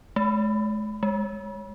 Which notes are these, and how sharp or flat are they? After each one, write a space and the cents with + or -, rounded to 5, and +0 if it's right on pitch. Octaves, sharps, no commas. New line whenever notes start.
G#3 +45
G#3 -15